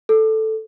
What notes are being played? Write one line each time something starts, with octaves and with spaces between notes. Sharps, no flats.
A4